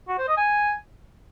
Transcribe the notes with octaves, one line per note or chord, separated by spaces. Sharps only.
F#4
C5
D#5
G#5